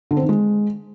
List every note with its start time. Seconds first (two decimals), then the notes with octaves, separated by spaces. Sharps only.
0.11 D3
0.17 C4
0.23 D#3
0.29 G#3